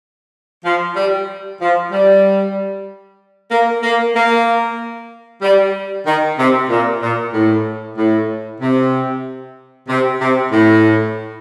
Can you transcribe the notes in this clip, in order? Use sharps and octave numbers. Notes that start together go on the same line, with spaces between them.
F3
G3
F3
G3
A#3
A#3
A#3
G3
D#3
C3
A#2
A#2
A2
A2
C3
C3
C3
A2